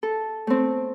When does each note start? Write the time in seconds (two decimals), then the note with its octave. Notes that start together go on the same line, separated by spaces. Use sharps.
0.03 A4
0.47 A3 C4